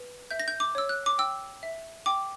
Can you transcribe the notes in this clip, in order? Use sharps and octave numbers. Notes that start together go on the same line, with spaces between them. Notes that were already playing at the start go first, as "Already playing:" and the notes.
Already playing: B4
E5 G6
A#6
G6
D6
C#5 E6
F#6
D6
G5 E6
E5
G5 D6